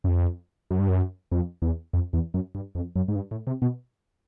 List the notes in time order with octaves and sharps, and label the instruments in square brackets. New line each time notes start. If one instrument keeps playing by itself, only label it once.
[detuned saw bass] F#2
F2
F#2
G2
F#2
F2
E2
F2
E2
F#2
G2
F2
F#2
G#2
G2
A2
C3
B2